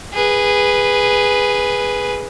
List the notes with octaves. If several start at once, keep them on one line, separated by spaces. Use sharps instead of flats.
G#4 B4